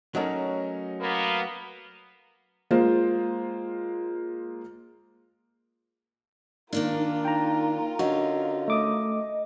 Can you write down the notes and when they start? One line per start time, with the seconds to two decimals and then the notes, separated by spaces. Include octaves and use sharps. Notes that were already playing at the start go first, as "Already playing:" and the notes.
0.15 F#3 A3 C#4 D#4 A#4
1.01 A#3 B3
2.71 G#3 A#3 F4 C5
6.73 D#3 A#3 D4 D#4 F4 A#4
7.25 D#4 G5 A#5
7.99 D3 C#4 D#4 F#4 D#5
8.68 A3 D6 D#6